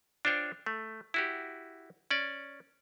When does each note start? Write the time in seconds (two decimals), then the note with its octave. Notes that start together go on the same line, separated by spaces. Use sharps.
0.25 D4 F4 C5 C#5 G5
0.66 A3
1.14 E4 F#4 G4
2.11 C#4 D5